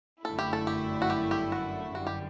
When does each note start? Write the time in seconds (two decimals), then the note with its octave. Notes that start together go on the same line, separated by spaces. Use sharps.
0.24 G1 F#2 D3 A3 E4 A4
0.39 G4
0.53 A4
0.67 G4
1.02 F#4
1.10 G4
1.31 G4
1.52 F#4
1.95 G1 F#2 D3 G3 F#4
2.07 G4